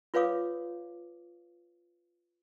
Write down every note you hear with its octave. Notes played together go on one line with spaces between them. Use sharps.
F4 B4 C#5 F5 D6 D#6